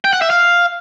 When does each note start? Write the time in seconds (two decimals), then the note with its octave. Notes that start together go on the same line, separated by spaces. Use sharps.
0.05 G5
0.13 F#5
0.22 E5
0.30 F5